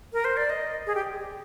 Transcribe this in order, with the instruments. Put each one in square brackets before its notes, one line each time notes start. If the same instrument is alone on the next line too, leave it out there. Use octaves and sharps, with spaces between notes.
[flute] A#4
C5
D5
D#5
G#4
G4